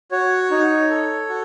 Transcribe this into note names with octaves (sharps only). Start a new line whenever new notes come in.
F#4 C#5
D#4
A4
F#4